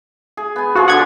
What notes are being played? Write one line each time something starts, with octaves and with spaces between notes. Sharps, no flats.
G#4
B3 G#5
F3 F4 F#4 G#4
D3 G4 F#5 G#6